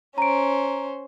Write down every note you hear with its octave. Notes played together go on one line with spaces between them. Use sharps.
C#4 C5 A#5 D7